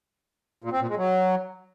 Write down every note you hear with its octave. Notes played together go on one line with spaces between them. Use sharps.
A#2
C4
A#2
G#3
F#3